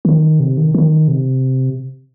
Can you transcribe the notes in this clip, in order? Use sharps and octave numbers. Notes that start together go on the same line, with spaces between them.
D#3
C3
D#3
D#3
C3